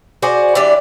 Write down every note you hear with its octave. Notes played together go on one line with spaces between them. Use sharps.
F#4 G#4 C5 D5
E3 D4 G4 D5